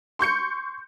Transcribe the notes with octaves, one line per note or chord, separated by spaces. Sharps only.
C6 C#6 G6 C#7